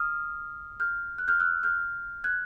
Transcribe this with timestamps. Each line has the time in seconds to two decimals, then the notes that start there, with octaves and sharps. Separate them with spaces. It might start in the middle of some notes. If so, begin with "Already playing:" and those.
Already playing: D#6 F6
0.80 F6 G6
1.18 F#6
1.28 F6 G6
1.40 E6 F#6
1.63 F6 G6
2.24 F#6 G#6